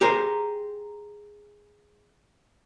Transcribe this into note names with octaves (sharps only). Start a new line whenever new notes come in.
G4 G#4 A#4 C5